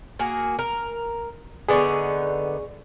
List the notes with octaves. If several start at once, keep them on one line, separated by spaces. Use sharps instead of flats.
A#3 F#4 G#4
A#4
D3 B3 D#4 G#4 D5 C#6